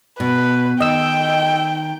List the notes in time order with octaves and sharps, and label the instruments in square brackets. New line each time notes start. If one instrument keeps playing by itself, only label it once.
[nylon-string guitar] B2 [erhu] B4
[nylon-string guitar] D#3 [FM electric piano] D#5 E6 [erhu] G5